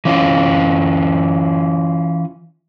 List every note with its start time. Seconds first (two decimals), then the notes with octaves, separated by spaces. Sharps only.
0.05 E3 C#4 F4